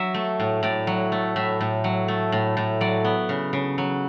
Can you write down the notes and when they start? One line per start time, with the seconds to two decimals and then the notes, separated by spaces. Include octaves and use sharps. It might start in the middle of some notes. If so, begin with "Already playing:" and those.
Already playing: F#3 E5
0.14 A3
0.40 A2
0.63 A2 D5
0.87 F#3
1.12 A3
1.36 A2 E5
1.61 A2
1.84 F#3
2.08 A3
2.32 A2
2.57 A2
2.81 F#3 D5
3.04 B3
3.29 C#3
3.53 C#3
3.78 F#3